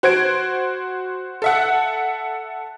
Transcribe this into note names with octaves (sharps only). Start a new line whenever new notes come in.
F#4 C5 G#6 D7
A4 E5 F#5